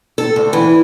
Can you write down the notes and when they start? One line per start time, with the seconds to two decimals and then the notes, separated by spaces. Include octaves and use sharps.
0.18 A4
0.36 D2
0.53 E3